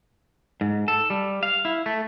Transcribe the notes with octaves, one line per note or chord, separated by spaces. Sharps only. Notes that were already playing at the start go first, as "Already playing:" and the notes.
G#2
A4
G3
F5
E4
A3